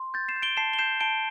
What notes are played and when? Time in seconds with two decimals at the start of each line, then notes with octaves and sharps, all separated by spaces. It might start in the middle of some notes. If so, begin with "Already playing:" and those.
Already playing: C6
0.14 G6 A6
0.28 C7 E7
0.36 G6
0.42 D7 G7
0.57 A5 C7 E7
0.73 G7
0.79 G6 C7 E7
1.00 A5 D7 G7